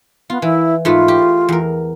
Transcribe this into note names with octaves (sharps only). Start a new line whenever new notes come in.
B3 F4
E3 E4
G#2 A3 F4 B4
G4
E2 A#4